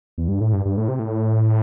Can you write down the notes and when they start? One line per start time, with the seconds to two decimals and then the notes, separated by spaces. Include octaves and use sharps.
0.18 E2
0.28 G2
0.40 A2
0.53 G2
0.65 G2
0.77 A2
0.88 C3
0.99 A2